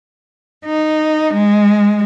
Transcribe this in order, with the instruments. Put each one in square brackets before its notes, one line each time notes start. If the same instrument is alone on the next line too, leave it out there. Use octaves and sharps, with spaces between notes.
[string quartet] D#4
G#3